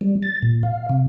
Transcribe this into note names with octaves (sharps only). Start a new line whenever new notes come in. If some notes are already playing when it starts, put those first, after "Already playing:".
G3
A6
A#2
F5
C3